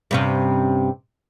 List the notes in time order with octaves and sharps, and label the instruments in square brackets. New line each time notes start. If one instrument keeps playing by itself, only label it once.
[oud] G2 C3 C#4